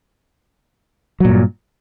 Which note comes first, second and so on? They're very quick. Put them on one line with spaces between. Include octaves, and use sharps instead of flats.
F#3 A#2 G2